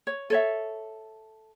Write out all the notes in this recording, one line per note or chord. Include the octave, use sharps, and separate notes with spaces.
C#5
A4 C#5 E5